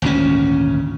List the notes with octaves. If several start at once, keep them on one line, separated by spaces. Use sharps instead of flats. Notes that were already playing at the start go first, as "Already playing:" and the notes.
G#1 D2 A#2 C#4